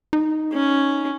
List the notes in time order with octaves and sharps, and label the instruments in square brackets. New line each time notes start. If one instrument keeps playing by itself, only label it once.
[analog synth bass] D#4
[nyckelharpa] C#4